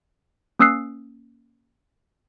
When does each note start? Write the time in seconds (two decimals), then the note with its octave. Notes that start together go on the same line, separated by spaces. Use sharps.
0.59 A#3 C#4 D#6 E6 F#6 C7